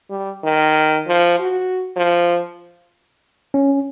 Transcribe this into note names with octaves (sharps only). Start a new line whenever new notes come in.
G3
D#3
F3
F#4
F3
C#4